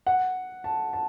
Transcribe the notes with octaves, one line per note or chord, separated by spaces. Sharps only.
F#5
A5
A5